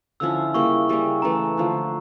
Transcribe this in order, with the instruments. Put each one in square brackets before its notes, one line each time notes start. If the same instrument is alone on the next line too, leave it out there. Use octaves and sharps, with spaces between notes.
[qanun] D3 F3 C#4 E4 [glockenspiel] E6
[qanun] C#3 G3 A#3 E4 [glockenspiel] C#6
[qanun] C#3 G3 A#3 C#4
[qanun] C#3 E3 A3 [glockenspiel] A#5
[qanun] D3 F3 A3